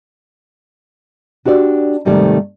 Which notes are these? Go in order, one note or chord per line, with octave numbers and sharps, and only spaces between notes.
D4 F#4 G4 C#5 D5
G#2 C3 D#3 G3 A3